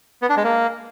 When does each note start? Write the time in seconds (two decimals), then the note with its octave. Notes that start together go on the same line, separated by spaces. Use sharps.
0.22 B3
0.29 D4
0.37 G#3
0.44 A#3